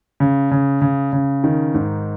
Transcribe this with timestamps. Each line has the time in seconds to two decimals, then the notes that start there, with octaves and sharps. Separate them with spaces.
0.20 C#3
0.51 C#3
0.81 C#3
1.13 C#3
1.44 D#3
1.74 G#2